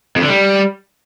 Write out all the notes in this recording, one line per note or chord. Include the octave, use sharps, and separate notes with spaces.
F2
D3
G3